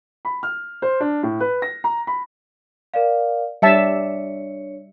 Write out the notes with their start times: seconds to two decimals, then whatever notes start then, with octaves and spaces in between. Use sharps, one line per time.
0.25 B5
0.43 F6
0.82 C5
1.00 D4
1.23 A2
1.40 B4
1.62 A#6
1.84 A#5
2.07 B5
2.94 A#4 D5 F5
3.62 G3 D4 C#5 E5 A5 C#7